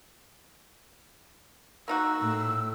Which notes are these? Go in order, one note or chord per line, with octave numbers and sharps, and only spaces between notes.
A#3 D#4 F#4 E6
A2